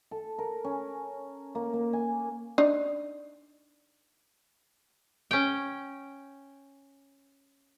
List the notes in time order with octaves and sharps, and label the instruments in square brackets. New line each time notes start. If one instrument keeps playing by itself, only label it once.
[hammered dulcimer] A4
A#4
C#4
A#3
A#3
G#5
[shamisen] D4 D#4 D#5
[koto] C#4 G5